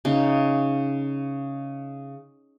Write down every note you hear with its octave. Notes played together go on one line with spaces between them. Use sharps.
C#3 D#4 F5